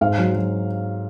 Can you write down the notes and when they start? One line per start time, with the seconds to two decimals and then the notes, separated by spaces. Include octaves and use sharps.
0.01 G#2 F5
0.18 F#3
0.34 F#3